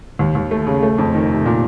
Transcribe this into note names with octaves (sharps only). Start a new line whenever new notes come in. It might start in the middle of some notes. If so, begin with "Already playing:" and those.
D#2
D#2
A3
C#3
A3
F2
D#3
C3
A#2